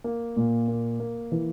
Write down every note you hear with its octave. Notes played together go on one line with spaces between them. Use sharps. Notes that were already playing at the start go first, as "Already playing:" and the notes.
A#3
A#2
A#3
A#3
E3